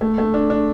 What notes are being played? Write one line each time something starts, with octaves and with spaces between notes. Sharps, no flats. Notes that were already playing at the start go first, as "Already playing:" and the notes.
A3
A3
D4
D4